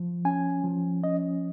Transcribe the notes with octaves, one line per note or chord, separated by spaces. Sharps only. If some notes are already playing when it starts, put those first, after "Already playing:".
Already playing: F3
C#4 G#5
F3
C#4 D#5